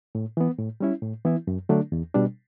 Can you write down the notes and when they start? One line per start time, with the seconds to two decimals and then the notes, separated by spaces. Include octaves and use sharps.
0.15 A2
0.37 E3 B3
0.58 A2
0.80 G3 C#4 E4
1.02 A2
1.25 E3 B3 E4
1.47 F#2
1.69 D3 F#3 A3 D4
1.92 E2
2.14 B2 G3 D4